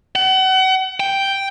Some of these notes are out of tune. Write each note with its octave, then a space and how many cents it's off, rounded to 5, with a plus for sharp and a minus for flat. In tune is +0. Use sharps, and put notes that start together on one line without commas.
F#5 +35
G5 +0